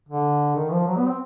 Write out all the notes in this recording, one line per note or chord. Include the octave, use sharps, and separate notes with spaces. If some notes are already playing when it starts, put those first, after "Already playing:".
D3
D#3
F3
F#3
B3
C4